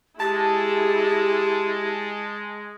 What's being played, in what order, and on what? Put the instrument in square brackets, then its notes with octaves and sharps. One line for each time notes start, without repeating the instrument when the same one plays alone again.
[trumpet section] G#3 [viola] E4 G#4 [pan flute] G4 [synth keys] A5